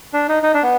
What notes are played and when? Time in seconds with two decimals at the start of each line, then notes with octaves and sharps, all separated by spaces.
0.13 D4
0.29 D#4
0.43 D#4
0.54 D4
0.63 B3